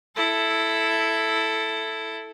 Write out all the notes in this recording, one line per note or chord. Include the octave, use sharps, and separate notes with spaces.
E4 A4